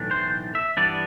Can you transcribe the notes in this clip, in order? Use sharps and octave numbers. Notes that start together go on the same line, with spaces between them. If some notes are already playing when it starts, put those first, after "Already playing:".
Already playing: B1 A2 E3 A3 D4
C5
E5
G2 E3 G3 B3 D4 D5